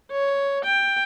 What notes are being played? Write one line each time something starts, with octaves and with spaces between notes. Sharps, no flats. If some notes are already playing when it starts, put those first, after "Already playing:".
C#5
G5